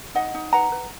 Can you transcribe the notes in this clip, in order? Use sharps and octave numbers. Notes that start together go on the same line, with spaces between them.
D#4 D#5 F#5
D#4
B4 F#5 A#5
B4